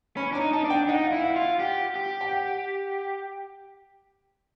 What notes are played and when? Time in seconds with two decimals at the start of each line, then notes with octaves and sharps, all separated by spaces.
0.17 C#4 B5
0.32 D4 A#5
0.41 D#4
0.53 D#4 A5
0.65 D4
0.70 G5
0.88 D#4 F#5
1.06 F5
1.12 E4
1.20 F5
1.24 F#5
1.36 F4
1.60 G4 F#5
1.95 G4
2.21 G5
2.31 F#5